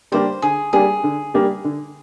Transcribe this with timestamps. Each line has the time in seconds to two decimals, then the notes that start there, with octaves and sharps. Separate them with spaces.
0.12 G3 A#3 D4 G4 C5
0.42 D3 G#4
0.73 G3 A#3 D4 G4 G#4
1.03 D3
1.34 G3 A#3 D4 G4
1.64 D3